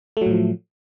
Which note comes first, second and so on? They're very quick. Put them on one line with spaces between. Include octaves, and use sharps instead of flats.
A3 F#3 A2 F3